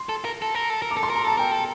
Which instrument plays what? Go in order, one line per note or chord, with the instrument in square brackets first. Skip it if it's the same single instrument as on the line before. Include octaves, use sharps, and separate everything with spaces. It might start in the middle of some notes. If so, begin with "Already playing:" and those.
Already playing: [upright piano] C6
[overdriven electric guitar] A4
A#4
A4
A#4
A4
A#4
[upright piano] D6
[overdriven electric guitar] A4
[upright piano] C6
[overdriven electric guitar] A#4
[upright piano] A#5
[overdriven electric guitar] A4 [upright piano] A5
[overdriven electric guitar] A#4 [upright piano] G5
[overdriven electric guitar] A4